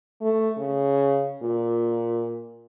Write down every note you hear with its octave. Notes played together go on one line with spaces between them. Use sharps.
A3
C#3
A#2